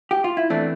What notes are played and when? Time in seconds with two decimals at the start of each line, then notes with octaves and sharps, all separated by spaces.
0.11 G4
0.24 F4
0.37 E4
0.50 E2 E3 A3 C4 D4